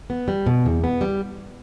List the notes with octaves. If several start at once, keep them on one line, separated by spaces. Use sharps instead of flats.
B3
G3
B2
E2
B3
G3